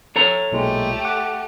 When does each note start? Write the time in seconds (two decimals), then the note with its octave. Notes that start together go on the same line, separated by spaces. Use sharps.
0.16 A4 C#5 A#5
0.52 B1 A#2 G#3 A3 G4
1.05 F#5 D6